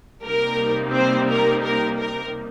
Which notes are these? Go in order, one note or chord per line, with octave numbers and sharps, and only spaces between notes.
C3 G3 A#3 D#4 A#4
C4 C5
A#4
A#4
A#4